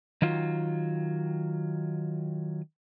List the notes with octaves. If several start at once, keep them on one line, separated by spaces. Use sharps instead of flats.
D#3 F#3 F4